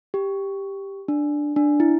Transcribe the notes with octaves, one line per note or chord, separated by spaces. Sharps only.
G4
D4
D4
E4